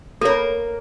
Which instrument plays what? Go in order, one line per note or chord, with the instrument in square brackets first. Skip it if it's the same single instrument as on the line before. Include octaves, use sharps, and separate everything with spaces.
[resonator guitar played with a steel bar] A#3 A#4 [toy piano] A4 C#5